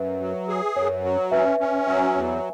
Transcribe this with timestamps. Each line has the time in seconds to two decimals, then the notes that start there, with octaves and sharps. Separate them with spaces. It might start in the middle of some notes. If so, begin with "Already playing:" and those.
Already playing: F#2 B4 E5
0.20 F#3
0.48 G#4
0.76 F#2 C#5
1.04 F#3
1.31 C#4 B4 E5
1.60 C#4
1.87 F#3 E5 G#5
2.15 E2